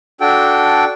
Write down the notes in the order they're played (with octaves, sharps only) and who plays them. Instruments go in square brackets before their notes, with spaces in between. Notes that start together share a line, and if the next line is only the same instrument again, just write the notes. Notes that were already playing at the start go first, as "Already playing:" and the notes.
[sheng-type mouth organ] D4 F#4 A4 G5